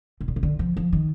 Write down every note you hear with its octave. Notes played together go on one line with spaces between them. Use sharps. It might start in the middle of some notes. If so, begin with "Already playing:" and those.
A2
A#2
C3
D3
F3
F3
D#3